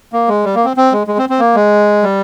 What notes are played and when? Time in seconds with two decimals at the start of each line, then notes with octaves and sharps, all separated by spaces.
0.13 A#3
0.28 G#3
0.44 G3
0.55 A#3
0.65 C4
0.77 C4
0.92 G#3
1.07 G#3
1.18 C4
1.29 C4
1.39 A#3
1.55 G#3
2.03 G3